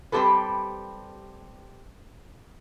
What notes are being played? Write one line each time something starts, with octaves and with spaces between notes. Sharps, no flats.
G3 C4 C#4 G4 A4 B4